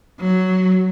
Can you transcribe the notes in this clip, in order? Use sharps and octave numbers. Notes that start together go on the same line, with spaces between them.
F#3